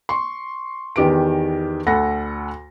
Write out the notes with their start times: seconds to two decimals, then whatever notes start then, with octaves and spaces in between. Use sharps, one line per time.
0.09 C6 C#6
0.96 E2 D#3 G4 B4 D7
1.86 D2 A4 F#5 B5 A#6